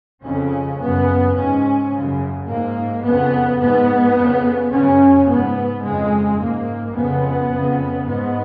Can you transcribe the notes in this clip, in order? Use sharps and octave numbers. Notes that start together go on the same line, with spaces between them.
F2 C#3 C#4
F#2 C#3 B3
G#2 C#4
F#2 C#3
G#2 A#3
F2 C#3 B3
G#2 B3
F2 C#3
F#2 C#3 C#4
G#2 B3
F2 C#3 G#3
G#2 A#3
F2 C#3 B3
F2 C#3
G#2 B3